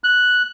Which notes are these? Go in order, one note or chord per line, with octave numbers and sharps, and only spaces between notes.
F#6